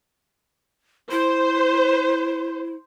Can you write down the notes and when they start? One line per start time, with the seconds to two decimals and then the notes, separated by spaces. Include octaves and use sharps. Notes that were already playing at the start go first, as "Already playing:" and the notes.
1.11 E4 C5